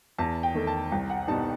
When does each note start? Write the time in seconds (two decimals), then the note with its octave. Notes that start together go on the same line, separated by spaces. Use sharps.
0.18 E2 A5
0.43 G5
0.55 D#3 A3
0.67 A5
0.92 C2 G5
1.10 F#5
1.28 B2 G3 D#4 A5